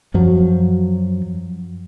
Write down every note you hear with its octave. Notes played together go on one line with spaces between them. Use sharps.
F#2 F3 F#3